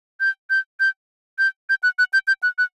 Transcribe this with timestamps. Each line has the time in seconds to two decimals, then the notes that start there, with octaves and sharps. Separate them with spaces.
0.20 G6
0.50 G6
0.80 G6
1.39 G6
1.69 G6
1.83 F#6
1.99 F#6
2.13 G6
2.28 G6
2.43 F#6
2.58 F#6